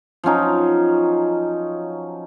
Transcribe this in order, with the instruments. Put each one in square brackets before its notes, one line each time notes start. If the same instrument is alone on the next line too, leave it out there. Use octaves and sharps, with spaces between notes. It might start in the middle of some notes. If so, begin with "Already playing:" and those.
[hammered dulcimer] F3 F#3 C#4 D#4